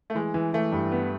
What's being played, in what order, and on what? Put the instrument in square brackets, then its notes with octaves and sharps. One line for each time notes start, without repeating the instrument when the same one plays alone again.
[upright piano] A3
[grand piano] E3 [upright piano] G#3
[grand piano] E3
[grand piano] E3 [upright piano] A3
[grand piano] G2
B3